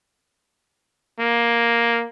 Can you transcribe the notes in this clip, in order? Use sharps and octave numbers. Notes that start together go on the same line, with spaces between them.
A#3